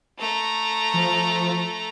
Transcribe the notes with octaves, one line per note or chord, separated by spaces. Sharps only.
A3 A#5
F3